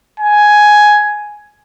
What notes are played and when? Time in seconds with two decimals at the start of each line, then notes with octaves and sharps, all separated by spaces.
0.20 G#5